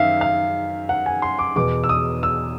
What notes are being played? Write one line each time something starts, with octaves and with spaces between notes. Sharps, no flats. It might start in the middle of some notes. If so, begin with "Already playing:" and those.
Already playing: F#2 D#3 E5 F5
F5
F#5
G#5
C6
D6
E2 B2 D6
E6
D#6
E6